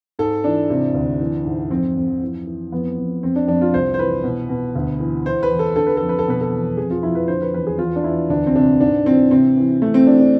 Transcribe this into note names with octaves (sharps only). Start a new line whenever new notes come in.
G#2 A4
E3 D4
C3
D2
E3
G#2
F2 C4
F2
E3
E3
F2 B3
F2
F2 C4
D4
F2 D4
F4
C2 C5
C5
E3 B4
B2
B2
D2
E3
E3 C5
B4
E2
A4
D3 A4
B4
F2 A4
B4
A4
B2 B4
A4
E2
F2 G#4
F4
F2 E4
B4
D3 C5
B4
E2 B4
G#4
E2 F4
D4
E2 E4
D2 D4
C4
C3 D4
G#2 D4
E3 C4
C3 C4
E3
E3 A3
C4
E3 D4
D4